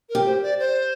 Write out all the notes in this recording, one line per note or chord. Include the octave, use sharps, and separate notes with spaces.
A#4
G4
C5
D5
C5